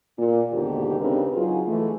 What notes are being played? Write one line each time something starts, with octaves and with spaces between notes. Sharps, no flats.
A#2
D#2 G#2 B2 D3 G4
C#3 C4 D4 D#4 A#4 B4
F#3 D#4 F4 F#4 G#4
E3 G#3 A3